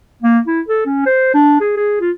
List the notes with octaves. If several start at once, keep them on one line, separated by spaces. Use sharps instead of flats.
A#3
E4
A4
C#4
C5
D4
G#4
G#4
F4